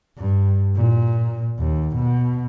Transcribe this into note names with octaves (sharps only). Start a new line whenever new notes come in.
G2
A#2
D#2
B2